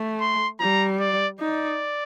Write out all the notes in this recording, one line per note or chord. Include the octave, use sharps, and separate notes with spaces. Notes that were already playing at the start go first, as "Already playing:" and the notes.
Already playing: A3
C6
G3 A#5
D5
D#4 D5